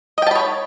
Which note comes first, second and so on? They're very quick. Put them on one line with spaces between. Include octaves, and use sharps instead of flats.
D#5 G5 A5 B5 C#5